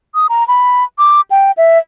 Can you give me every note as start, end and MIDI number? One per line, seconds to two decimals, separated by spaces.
0.15 0.27 87
0.29 0.46 82
0.48 0.84 83
0.98 1.21 86
1.31 1.51 79
1.57 1.78 76